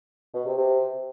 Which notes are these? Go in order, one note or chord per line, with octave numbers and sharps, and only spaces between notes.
B2
C3
C3